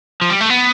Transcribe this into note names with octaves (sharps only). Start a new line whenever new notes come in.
F3
G3
A3
B3